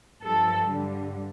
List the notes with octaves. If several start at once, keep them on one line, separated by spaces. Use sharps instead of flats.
G2 F3 A4
G2 D3 G3